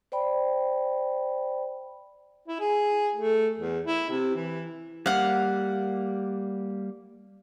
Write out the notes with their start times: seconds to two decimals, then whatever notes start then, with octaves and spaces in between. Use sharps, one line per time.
0.12 C5 D5 G5 B5
2.48 E4
2.60 G#4
3.15 A3
3.58 E2
3.85 E4
4.10 C3
4.36 E3
5.06 G3 A#3 F5 F#5